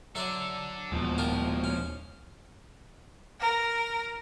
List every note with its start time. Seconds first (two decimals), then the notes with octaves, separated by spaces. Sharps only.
0.15 F#3 A4 D5 E5 C6
0.92 D#1 G#2 B2 F3
1.18 F4 G4 A#4
1.64 C#4
3.39 A#4